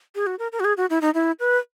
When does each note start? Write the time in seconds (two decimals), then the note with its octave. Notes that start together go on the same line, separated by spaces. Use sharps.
0.15 G#4
0.27 F#4
0.39 A#4
0.52 A#4
0.60 F#4
0.65 G#4
0.77 F#4
0.90 E4
1.02 D#4
1.14 E4
1.40 B4